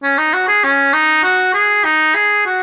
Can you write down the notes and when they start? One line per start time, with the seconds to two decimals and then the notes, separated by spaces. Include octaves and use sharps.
0.03 C#4
0.18 D#4
0.33 F#4
0.48 G#4
0.64 C#4
0.93 D#4
1.23 F#4
1.54 G#4
1.84 D#4
2.15 G#4
2.46 F#4